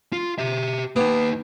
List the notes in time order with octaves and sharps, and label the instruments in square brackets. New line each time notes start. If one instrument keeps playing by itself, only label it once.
[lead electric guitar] F4
G4 E5
[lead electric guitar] A#3 D#4 [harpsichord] B3 G4